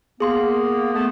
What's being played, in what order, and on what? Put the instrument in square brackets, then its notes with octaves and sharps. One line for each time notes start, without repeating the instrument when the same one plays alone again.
[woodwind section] A#3 B3 [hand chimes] G#4 C6
[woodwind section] A3 B3